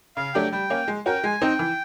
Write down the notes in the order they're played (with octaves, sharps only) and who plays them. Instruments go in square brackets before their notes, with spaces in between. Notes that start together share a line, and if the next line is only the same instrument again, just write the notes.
[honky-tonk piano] C#3 [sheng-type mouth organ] F5
[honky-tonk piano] F#3 A3 D4 G4 [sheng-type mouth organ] G5
[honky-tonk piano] G3 [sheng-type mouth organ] G5
[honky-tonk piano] A#3 C#4
G#3
[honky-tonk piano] C#4 F#4 A#4 [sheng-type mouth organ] G5
[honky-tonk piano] G#3 [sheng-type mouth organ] G#5
[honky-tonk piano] C4 D#4 [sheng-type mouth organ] G5
[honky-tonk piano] E3